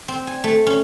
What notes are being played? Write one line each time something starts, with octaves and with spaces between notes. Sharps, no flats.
C4
G#5
A3
C#4